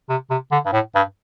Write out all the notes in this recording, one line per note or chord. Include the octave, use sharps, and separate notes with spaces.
C3
C3
D3
G2
A2
G2